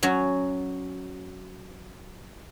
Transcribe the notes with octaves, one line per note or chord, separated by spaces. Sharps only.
F#3 C#4 F#4